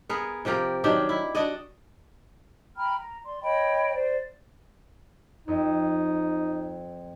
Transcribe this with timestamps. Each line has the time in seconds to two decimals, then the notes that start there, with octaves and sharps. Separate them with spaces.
0.09 B3 G#4 A#4
0.45 C3 F3 G4 A#4
0.84 D#3 F#3 D4 G4
1.09 E4
1.35 D4 F#4 D5 D#5
2.76 G5 A#5 B5 F6
2.98 A#5
3.25 D5 C6
3.42 C#5 D#5 G5 B5
3.94 C5 D5
5.48 F2 D#4